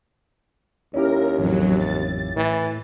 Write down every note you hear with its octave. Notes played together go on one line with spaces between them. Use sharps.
D#2 C#4 E4 G4 A#4
A1 F2 F#3
A6
A2 E3